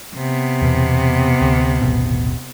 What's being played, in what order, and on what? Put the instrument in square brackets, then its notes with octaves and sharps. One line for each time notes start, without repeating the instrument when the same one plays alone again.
[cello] C3 B3
[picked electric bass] E2 B2
D2
D#1 A1 B2